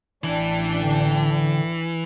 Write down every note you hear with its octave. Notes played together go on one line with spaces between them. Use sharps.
A1 E3 D4 G5
D3